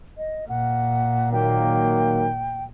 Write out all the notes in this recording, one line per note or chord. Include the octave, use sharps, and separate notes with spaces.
D#5
A#2 F#5
D#3 F#3 A#3 G5